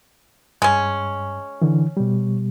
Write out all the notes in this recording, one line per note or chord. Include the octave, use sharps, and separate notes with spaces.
G2 G#3 C#4
D3 E3
B2 G3